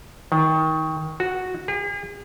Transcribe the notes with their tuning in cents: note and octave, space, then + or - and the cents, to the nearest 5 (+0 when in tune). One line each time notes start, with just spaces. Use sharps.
D#3 +25
F#4 -5
G#4 -45